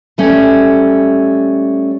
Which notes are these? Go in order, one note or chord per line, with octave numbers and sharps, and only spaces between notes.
G3 A3 C#4